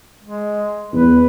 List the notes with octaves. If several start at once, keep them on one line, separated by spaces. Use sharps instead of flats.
G#3
E2 B4